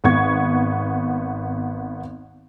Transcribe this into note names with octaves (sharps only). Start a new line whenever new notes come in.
G#1 B3 C#6 G#6